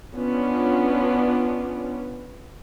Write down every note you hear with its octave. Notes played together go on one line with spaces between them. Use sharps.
B3 C#4 D4 F4